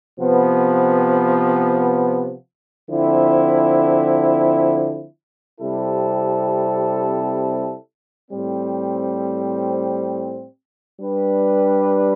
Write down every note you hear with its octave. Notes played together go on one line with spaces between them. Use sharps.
C3 F3 B3
D3 F3 C4 E4
C3 G3 C4 E4 A4
A2 G3 C4
G3 D4 G4 B4